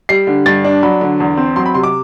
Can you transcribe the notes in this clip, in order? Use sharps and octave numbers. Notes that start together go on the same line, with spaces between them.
G3 C7
D3
G2 A6
D4
F#3 B5
D3
E2
C4
F#3 C6
B5
C3 C6
D6